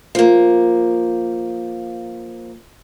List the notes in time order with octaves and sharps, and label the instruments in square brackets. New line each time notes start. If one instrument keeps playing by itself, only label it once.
[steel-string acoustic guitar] F3 A#3